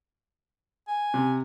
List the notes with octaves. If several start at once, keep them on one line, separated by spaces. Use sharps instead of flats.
G#5
C3